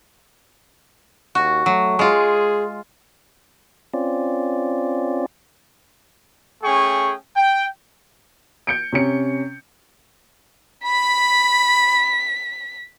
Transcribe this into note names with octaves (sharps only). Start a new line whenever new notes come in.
D#2 F#4
F#3 A3
G#3 F4 G#4
C4 C#4 F4 D5
A3 C#4 G#4 G5 C#6
G5
G6 C#7 D7
C3 C#4 C#7
B5 B6